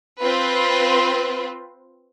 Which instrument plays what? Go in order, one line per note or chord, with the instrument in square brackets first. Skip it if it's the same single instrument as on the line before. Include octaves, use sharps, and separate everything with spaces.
[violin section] C4 F4 B4